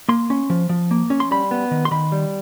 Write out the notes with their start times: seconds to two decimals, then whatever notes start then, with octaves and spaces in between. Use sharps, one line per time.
0.08 A#3 C6
0.30 C#4
0.50 F3
0.69 F3
0.91 A#3
1.10 C#4
1.20 C6
1.31 G3 B5
1.51 B3
1.71 D#3
1.85 C6
1.91 D#3 B5
2.12 G3